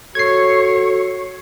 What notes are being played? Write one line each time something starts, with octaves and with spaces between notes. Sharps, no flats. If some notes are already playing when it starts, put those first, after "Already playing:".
F#4 A4 C#5 G#6 C7